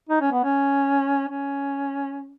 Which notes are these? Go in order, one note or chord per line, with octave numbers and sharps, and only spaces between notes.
D#4
C#4
B3
C#4
C#4